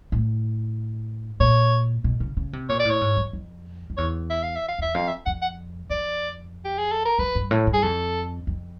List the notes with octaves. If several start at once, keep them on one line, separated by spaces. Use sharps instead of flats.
A2
A#2 C#5
B2
C#3
C#3
C3
A#2 C#5
D5
A2
C#5
G#2
F2
F2
F2
E2 C#5
E5
F5
E5
F5
E2 E5
F2 F5
E5
F2 F#5
F#5
F2 D5
G4
G#4
A4
A#4
F2 B4
G2
A2
G2
G#4
F2 A4
F2